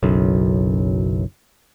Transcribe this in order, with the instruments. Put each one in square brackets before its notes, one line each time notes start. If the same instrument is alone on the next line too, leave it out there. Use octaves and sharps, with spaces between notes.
[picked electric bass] F#1 B1 F#2